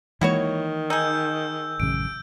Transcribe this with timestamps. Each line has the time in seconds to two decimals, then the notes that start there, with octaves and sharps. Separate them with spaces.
0.21 D#3 E3 G#3 A#3 E4 F#4 C#5
0.90 D#4 G#4 E6 G6
1.80 A1 F#2 C#3 D7